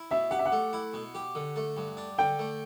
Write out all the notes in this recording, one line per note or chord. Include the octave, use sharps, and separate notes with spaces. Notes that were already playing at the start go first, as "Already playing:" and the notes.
Already playing: E4
B2 E5
G4 F#5
E5
F#5
A3
E4
B2
G4
D3
A3
G2
D4
D3 G5
A3